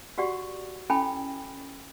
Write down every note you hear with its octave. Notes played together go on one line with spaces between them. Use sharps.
F#4 G4 D5 F#5 C#6
C#4 E4 A4 G5 G#5 B5